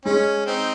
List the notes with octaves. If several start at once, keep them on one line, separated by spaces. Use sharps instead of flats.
G#3 C#4
C4 D#4